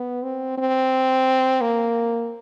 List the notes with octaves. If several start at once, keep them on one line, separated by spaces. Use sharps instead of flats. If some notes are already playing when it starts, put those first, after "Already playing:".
Already playing: B3
C4
C4
A#3